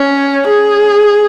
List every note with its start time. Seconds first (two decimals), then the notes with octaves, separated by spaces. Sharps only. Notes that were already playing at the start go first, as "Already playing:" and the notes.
Already playing: C#4
0.47 G#4